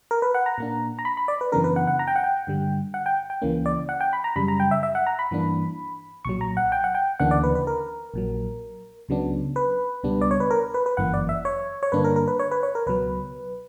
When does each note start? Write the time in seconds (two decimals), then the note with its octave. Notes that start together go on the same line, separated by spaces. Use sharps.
0.11 A#4
0.22 B4
0.34 F#5
0.46 A#5
0.58 A#2 A#3 D4
0.99 A#5
1.05 B5
1.17 B5
1.28 D5
1.41 B4
1.52 F#2 C#3 E3 B3 D4 A#4
1.64 B4
1.76 F#5
1.87 F#5
1.99 A#5
2.08 G5
2.16 F#5
2.24 G5
2.47 G2 D3 G3
2.94 F#5
3.06 G5
3.30 G5
3.42 C#2 C#3 E3 A#3 C#4
3.66 D5
3.89 F#5
4.01 G5
4.13 B5
4.24 A#5
4.36 F#2 C#3 G3 B5
4.48 A#5
4.60 G5
4.71 E5
4.83 E5
4.95 F#5
5.07 A#5
5.19 B5
5.31 G2 E3 A#3 D4
6.25 B1 A#2 F#3 C#6
6.41 A#5
6.57 F#5
6.72 G5
6.84 F#5
6.95 G5
7.20 D2 C#3 E3 A#3 D4 F#5
7.31 D5
7.44 B4
7.55 B4
7.67 A#4
8.14 A#1 A#2 F#3
9.08 C#2 C#3 F#3 B3 D4
9.56 B4
10.03 C#2 B2 G3 B3 D4
10.21 D5
10.31 C#5
10.40 B4
10.51 A#4
10.74 B4
10.86 B4
10.97 G1 F#2 E3 A#3 F#5
11.14 D5
11.29 E5
11.45 C#5
11.83 C#5
11.92 G2 D3 A#3 D4 B4
12.04 A#4
12.16 A#4
12.28 B4
12.39 C#5
12.51 B4
12.63 C#5
12.75 A#4
12.87 C#2 B2 F#3 B4